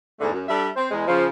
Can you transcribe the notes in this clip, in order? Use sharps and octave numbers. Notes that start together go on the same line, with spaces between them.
E2 G#2 D3 A3
F#2
G3 D4 A4 E5
C4 C5
E2 G#3
C#3 F3